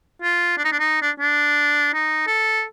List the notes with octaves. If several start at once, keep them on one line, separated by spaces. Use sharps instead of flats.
F4
D4
D#4
D4
D#4
D4
D4
D#4
A4